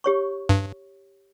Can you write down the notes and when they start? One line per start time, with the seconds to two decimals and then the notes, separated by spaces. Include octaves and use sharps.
0.04 G4 C#5 C#6
0.49 G2